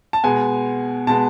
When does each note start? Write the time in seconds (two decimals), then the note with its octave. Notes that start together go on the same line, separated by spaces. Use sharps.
0.13 A5
0.24 B2 G#3 B3 G#5
1.07 B2 G#3 B3 A5